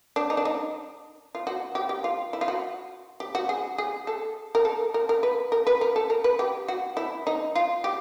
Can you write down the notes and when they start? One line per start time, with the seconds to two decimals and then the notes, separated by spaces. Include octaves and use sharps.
0.16 D4
0.30 D#4
0.37 D4
0.45 D#4
1.35 F4
1.47 F#4
1.75 G4
1.89 G4
2.04 F4
2.33 E4
2.41 F4
2.48 F#4
3.20 G4
3.35 F#4
3.49 G#4
3.78 G#4
4.07 A4
4.55 A#4
4.65 A4
4.94 A#4
5.09 A#4
5.23 B4
5.52 A#4
5.67 B4
5.81 A#4
5.96 A4
6.10 A#4
6.24 B4
6.39 G4
6.68 F#4
6.97 E4
7.27 D#4
7.55 F4
7.84 G4